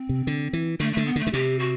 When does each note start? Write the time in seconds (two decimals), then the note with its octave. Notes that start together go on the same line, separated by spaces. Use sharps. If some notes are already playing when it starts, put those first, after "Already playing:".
Already playing: C4
0.09 C3
0.27 D3
0.53 E3
0.80 D3 A3
0.93 D3 A3
1.06 B3
1.16 D3
1.20 A3
1.27 D3
1.33 C3 G4
1.59 F#4